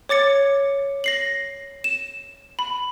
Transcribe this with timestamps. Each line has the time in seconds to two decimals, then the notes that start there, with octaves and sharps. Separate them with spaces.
0.09 C#5 D6 A6 C#7
1.04 A#6 C7 F#7
1.84 E7
2.59 B5